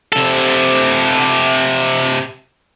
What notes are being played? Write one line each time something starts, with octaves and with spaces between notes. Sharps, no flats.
C3 A4